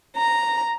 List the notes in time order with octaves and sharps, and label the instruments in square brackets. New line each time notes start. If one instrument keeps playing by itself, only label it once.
[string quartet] A#5